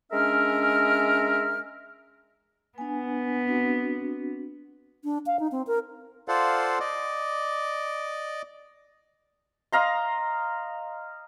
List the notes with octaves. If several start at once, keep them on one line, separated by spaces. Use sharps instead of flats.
G#3 C#4 D4 A#4 E5 F6
B3 D4 G#5
C4 D4 F#4
D4
F5
D#4
C4
A#4
F4 A4 C5 D5 F5 F#5
D5 D#5 D6
D#5 F5 A#5 C6